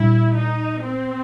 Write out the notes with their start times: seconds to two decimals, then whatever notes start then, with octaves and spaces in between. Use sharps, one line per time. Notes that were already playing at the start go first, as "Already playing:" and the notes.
Already playing: A#2 G3 D4 E4
0.35 D#4
0.83 C4